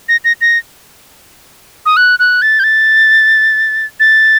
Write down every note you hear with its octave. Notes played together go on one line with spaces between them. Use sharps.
A#6
A#6
A#6
D#6
F#6
F#6
A6
G6
A6
A6